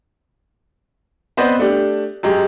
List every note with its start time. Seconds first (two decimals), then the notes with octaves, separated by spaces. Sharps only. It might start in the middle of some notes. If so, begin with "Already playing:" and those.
1.37 B3 C4 B4 C5 D5 D#5
1.59 A3 D4 G4
2.23 F#2 G#3 G4